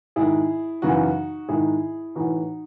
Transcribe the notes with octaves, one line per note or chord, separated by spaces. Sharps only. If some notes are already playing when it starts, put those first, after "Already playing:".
G#2 D#3 E4 G#4
F#2 C#3 E3 D#4 F#4
G#2 D#3 E4 G#4
A2 E3 D#4 F#4